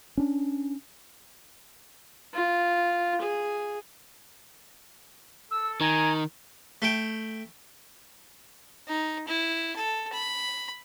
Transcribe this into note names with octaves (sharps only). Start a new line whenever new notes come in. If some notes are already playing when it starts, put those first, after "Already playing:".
C#4 D4
F4
G#4
A4 E6
D#3 G#5 A#5
A3 G5
D#4
E4
A4
B5